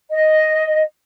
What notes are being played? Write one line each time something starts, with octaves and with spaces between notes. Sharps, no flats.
D#5